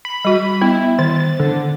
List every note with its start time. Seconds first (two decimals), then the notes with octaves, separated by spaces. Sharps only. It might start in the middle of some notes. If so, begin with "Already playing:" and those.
0.05 B5
0.25 G3 F#4
0.61 B3 E4
0.99 D#3 A6
1.40 D3